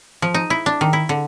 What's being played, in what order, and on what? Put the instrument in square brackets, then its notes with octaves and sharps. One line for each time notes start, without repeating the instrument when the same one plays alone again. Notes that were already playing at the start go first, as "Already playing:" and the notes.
[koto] F3
D#4
E4
D4
D#3
E4
D3